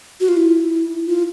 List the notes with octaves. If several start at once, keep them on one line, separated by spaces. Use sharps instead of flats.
F#4
F4
E4
F4